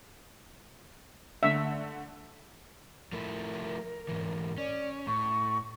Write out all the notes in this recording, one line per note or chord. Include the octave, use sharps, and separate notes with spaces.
D3 A3 E5
F3 A3 E4 A#4
G#2 E3
C#4 D5
A2 C#6